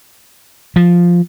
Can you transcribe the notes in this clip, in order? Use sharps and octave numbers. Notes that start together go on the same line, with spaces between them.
F3